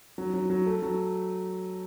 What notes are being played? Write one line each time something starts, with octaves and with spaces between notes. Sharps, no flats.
F#3
F#3
F#3
A3
F#3